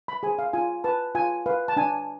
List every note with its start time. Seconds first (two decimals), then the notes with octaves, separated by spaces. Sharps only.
0.08 B5
0.23 G#4 G#5
0.26 C5
0.39 F5
0.53 F4 G#5
0.84 B4 A5
1.15 F4 G#5
1.46 B4 F5
1.68 A5
1.77 D4 G#5